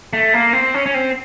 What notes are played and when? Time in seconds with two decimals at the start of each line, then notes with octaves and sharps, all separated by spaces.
0.13 A3
0.34 A#3
0.53 C4
0.74 C#4
0.86 C#4
0.94 C4